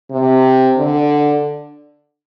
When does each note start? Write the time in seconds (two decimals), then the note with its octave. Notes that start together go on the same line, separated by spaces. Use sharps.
0.11 C3
0.78 D3